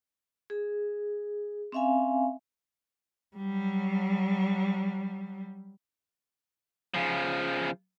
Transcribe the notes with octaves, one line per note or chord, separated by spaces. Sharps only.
G#4
C4 C#4 E5 F5 G#5
F#3 G3
C#3 F3